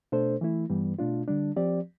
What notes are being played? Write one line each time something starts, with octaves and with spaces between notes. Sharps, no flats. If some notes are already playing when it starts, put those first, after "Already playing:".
B2 A3 D4 A4 C5
E3 A3 E4
G2 E3 G3 B3
B2 A3 D4 F4
D3 G3 D4
F3 C4 G4 D5